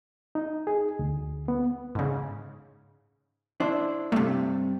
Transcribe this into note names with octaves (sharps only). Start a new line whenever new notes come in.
D#4
G#4
D2
B3
G#2 C#3
D4 E4 C5
G2 C3 A3